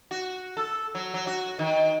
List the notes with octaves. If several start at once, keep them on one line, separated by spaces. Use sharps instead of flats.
F#4
A4
F#3
F#3
F#4
D#3